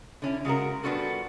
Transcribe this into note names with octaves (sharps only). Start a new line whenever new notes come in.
D3 C#4 E4
C#3 G#3 F#4 A#4
G3 B3 D4 F4 F#4 A4